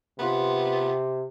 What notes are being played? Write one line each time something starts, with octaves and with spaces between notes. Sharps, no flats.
C3 B3 F4 B4